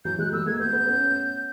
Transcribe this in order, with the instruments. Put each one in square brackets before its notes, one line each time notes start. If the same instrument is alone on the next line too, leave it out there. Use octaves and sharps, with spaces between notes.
[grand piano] E3 F#3 [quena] G6
[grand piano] F#3 G#3 [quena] F#6
[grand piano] G3 A3 [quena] E6
[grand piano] G#3 A#3 [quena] G#6
[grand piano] A3 B3 [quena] G6
[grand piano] A3 B3
B3 C#4
B3 C#4